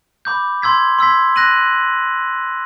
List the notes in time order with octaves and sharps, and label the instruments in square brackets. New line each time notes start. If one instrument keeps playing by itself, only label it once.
[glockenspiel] B5 D6 G6
C6 E6 G#6 B6
C6 E6 G#6 B6
F#6 A#6 D#7 F#7